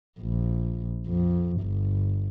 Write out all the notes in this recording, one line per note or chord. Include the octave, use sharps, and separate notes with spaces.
A#1
F2
G1